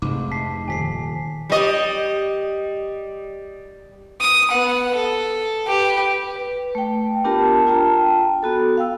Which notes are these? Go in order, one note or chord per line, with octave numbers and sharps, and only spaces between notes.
F1 G#2 D6
A5 B6 C7
D#1 G#5 B6 C7
G3 D#5
D#6
B3 F#5
A4
G4 B4
B4
A3 G5
B3 D4 F4 G4 A#4 A5
F4 G5 A5 A#5
B3 F#4 A4
F5 G5 E6